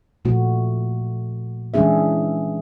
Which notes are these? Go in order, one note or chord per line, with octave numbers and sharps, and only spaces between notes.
A#2 F3 A3 F#4
E3 G#3 C#4 D4 G#4 E5